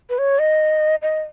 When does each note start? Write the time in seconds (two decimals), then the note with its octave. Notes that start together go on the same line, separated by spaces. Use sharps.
0.09 B4
0.18 C#5
0.39 D#5
1.02 D#5